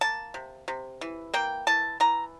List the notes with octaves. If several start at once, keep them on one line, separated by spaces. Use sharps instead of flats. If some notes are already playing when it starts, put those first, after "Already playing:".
A#3 A5
C3
C3
E3
A#3 G5
E3 A5
E3 A#5